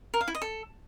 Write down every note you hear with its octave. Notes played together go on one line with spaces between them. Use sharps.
A#4
F5
E4
D#5
A4